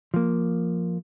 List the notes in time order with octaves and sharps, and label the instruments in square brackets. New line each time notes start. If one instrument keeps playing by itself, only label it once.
[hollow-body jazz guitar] F3 A#3